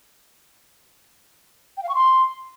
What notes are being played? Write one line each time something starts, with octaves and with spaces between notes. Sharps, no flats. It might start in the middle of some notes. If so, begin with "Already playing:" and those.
G5
F5
C#6
C6